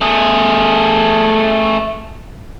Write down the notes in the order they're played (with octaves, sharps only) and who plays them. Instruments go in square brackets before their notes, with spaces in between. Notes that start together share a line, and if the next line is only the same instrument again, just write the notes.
[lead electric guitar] A3 G#4